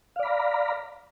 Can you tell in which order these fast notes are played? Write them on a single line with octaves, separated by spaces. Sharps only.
F5 D5 B5 A#5